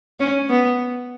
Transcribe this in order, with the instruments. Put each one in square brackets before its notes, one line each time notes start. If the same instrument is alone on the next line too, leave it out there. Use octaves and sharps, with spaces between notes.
[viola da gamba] C#4
B3